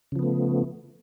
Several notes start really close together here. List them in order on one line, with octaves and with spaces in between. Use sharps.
C#3 F3 B3 A3